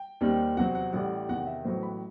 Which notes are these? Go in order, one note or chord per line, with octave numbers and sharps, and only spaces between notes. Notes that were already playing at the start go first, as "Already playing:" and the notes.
Already playing: G5
D#2 D#3 G3 C4
E2 C3 F#3 C4 F#5
F#5
A1 A2 G3 F#5
E2 C3 D#3 F#5
E5
A1 A2 F#3 B3 C5
B5